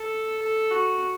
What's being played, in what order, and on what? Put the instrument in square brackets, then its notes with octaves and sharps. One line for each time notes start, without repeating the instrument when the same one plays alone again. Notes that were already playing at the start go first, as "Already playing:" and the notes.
Already playing: [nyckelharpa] A4
A4
F#4